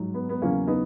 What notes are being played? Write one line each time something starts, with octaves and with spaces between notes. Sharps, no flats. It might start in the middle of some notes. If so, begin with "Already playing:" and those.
Already playing: G#2 F#3
B3
B3
E2 C#3 F#3 A#3 C#4
B3 D#4